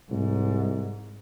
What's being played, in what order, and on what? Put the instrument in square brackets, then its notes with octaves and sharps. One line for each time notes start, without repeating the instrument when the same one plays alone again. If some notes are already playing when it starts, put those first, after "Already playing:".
[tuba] C2 [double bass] G#2